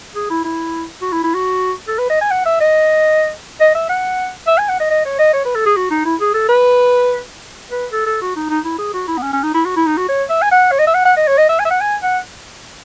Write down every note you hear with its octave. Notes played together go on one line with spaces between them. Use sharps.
G#4
E4
E4
F#4
E4
E4
F#4
A4
B4
D#5
G#5
F#5
E5
D#5
D#5
E5
F#5
E5
G#5
F#5
D#5
D#5
C#5
D#5
C#5
B4
A4
G#4
F#4
D#4
E4
G#4
A4
B4
B4
A4
A4
F#4
D#4
D#4
E4
G#4
F#4
E4
B3
C#4
C#4
D#4
E4
F#4
E4
D#4
F#4
C#5
E5
G#5
F#5
C#5
D#5
E5
F#5
F#5
D#5
C#5
D#5
E5
G#5
E5
F#5
G#5
F#5